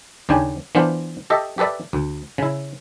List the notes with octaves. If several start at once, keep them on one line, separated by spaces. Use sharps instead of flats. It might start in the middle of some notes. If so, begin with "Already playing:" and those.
D#2 C#3 D4 G5 G#5
E3 B3 D4 F4 C5
G4 A4 D#5 E5
G4 A4 B4 D5 E5
D2
C#3 E4